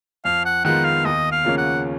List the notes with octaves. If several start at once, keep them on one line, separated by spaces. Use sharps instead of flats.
F2 F5
F#5
D#3 G#3 B3 F4 F#5
F5
D#2 D#5
F5
C#3 F3 A#3 C#4
F#5